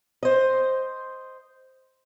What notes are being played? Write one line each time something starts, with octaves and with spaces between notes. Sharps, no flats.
C5 D#5